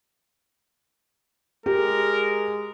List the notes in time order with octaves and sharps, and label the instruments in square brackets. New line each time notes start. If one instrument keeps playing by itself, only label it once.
[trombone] G#3 [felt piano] G4 [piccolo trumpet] A#4